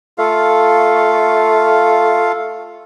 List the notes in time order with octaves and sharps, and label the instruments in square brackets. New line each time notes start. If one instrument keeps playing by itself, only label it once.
[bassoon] A3 [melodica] F4 A4 F5